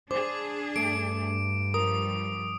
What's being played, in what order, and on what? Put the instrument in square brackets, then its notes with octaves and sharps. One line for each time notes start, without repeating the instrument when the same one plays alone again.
[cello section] D4 G#4 [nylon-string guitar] C5 [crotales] D6
[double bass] G2 [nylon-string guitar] A3 [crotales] D7
[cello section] F3 G3 [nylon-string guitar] A#4 [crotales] D#6